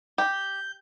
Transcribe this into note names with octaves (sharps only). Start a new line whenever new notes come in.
G4 G6